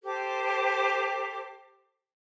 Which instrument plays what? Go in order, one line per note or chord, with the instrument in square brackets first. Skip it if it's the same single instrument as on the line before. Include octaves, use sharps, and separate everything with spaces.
[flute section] G4 A4 C5 D6